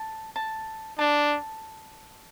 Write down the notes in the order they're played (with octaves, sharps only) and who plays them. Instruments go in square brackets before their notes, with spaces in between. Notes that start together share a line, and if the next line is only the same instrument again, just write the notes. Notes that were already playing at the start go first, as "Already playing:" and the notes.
Already playing: [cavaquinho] A5
A5
[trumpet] D4 [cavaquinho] A5